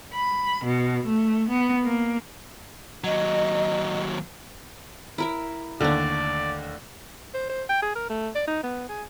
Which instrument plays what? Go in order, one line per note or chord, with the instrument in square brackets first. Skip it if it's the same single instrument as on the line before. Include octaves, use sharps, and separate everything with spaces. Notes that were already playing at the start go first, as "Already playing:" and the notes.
[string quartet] B5
B2
A3
B3
A#3
[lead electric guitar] D#2 F#3 [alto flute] D#5
[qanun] E4 A#4 E5
[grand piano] D#2 D3 [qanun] A3 D4 [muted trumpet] D5
[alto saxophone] C5
C5
G5
G#4
A#4
A3
D5
D#4
B3
G#4